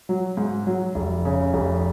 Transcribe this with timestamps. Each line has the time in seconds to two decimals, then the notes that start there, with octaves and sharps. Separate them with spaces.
0.09 F#3
0.37 G#2
0.67 F#3
0.95 F1
1.25 C#3
1.54 F1